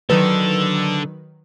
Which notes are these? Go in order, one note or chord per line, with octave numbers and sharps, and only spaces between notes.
D3 D#3 F#3 A4 B4